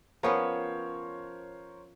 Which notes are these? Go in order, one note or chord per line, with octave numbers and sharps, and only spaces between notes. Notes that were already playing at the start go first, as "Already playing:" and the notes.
F3 B3 C#4 A#4 C5 C#5